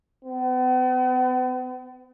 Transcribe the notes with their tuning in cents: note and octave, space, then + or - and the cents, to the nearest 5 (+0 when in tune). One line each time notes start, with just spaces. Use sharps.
B3 +45